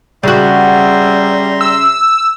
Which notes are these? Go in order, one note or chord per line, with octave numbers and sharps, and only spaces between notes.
C#3 G3 F#4 E5 A#5 C6
E6